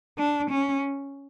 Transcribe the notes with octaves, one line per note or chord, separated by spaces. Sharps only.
D4
C#4